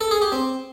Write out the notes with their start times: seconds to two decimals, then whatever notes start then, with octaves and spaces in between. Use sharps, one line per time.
0.01 A4
0.11 G#4
0.22 G4
0.32 C4